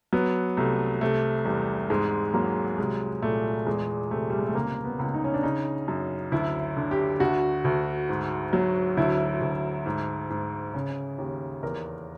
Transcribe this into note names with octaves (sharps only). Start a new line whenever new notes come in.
F#3 B3
C2 A3
C3 A3
E2 G3
G#2 G#3
F#3 A#3
C2 G#3
A#2 A3
E2 G#3
C3 A3
G3
G#3
A3
C#2 A#3
B3
C#2
D#4
C#4
D4
C#3 D#4
F#2
D2 E4
D3
G4
D2 F#4
D2
G#2
F#3
D2 E4
D2
G#2
G#2
C#3
D#2
E2 A#4